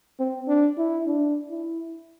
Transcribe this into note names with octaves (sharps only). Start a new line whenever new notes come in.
C4
D4
E4
D4
E4